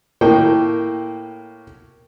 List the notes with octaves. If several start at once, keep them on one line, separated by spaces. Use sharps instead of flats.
A2 A#3 G5